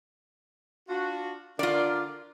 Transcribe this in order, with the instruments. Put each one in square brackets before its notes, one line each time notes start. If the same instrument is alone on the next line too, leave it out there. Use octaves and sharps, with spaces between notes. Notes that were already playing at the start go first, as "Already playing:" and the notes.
[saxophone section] D4 F4 F#4
[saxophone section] D3 D4 A#4 [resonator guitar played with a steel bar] F4 D5